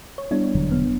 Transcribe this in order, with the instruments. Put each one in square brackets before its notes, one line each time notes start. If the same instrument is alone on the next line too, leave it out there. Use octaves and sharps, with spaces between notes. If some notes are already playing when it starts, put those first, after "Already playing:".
[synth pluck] C#5
[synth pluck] G3 D4 E4 [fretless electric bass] B3
[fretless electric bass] E1 D3 F#3
[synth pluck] B3